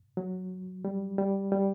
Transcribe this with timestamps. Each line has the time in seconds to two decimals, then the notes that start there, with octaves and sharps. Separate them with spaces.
0.17 F#3
0.85 G3
1.18 G3
1.52 G3